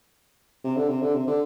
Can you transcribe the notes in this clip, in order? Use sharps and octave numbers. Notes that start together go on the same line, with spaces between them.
C3
D3
C3
D3
C3
D3